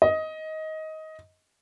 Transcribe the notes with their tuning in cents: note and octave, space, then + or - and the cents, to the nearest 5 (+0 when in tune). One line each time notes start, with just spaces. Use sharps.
D#5 +15